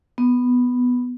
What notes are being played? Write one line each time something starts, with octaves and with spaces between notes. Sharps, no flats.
B3